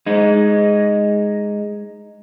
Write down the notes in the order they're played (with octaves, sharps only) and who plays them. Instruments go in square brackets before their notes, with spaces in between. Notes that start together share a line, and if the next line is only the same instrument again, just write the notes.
[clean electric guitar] G#3 D#4